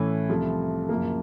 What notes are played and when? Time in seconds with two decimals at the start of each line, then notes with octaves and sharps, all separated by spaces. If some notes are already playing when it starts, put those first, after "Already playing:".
Already playing: A2 E3 A3 C#4
0.29 C2 C3 F3 A3
0.89 F#2 C#3 F3 A#3